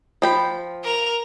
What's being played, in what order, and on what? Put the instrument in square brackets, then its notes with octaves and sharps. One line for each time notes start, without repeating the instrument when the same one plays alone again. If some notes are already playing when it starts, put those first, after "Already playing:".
[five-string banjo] F3 G5 B5
[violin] A#4 F7